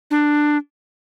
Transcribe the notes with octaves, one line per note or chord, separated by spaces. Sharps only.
D4